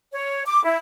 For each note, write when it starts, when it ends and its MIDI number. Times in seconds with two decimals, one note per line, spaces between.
0.13 0.44 73
0.46 0.63 86
0.64 0.77 64